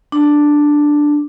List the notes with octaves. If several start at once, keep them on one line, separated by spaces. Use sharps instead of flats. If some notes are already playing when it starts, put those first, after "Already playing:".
D4